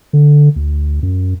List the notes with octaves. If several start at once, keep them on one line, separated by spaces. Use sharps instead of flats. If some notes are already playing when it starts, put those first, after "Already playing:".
D3
D2
F#2